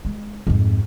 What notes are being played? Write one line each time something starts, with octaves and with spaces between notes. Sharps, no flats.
G#3
F2 G#2